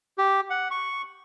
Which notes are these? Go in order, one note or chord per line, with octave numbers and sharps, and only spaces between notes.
G4
F#5
C#6